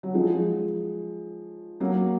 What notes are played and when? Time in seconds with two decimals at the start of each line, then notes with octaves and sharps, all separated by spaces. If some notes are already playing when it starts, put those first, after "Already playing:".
0.03 F#3
0.14 F3 G#3
1.80 F#3 A#3